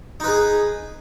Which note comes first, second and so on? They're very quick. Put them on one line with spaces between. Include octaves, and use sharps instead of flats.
D#4 B4 G#4